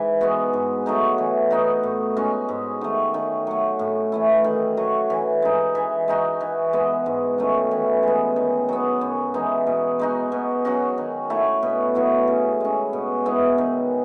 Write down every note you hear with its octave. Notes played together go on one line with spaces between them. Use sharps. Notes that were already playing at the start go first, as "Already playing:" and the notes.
Already playing: G#2 E3
G#3 B3 F#4
G#2
F#3 A3 D#4
E3
B3 D#4 F#4
A2
G#3 C#4 F#4
G#2
D#3 A3
D#3
F#3 A3
A2
E3 A3 E4
D#3
F#3 A3
E3
G#3 D#4
E3
G#3 D#4 F#4
E3
G#3 B3
G#2
D#3 A3 C#4
E3
G#3 B3
D#3
F#3 B3
F#2
E3 G#3 D#4
B2
G#3 D#4 F#4
B2
F#3 C#4 F#4
D#3
A3 E4
B2
F#3 B3 E4
C#3
G#3 C#4
B2
G#3 B3 E4
D#3